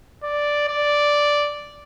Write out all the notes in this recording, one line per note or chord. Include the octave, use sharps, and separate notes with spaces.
D5
D5